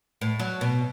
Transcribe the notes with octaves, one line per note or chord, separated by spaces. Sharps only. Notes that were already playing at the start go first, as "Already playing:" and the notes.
A2
F#3
B2